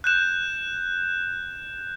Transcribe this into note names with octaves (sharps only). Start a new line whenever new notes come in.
F#6 G6 E7